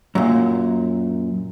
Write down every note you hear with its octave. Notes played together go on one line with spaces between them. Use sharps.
F#2 A#2